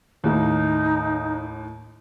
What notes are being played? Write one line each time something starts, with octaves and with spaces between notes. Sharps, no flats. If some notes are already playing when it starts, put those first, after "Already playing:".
D#2 A2 D#4